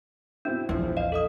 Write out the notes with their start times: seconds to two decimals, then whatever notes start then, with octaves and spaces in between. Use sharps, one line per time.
0.45 B2 C4 D4 E4
0.69 A#1 E2 E3 F3
0.97 D#5 F5
1.12 A4 D#5 D#6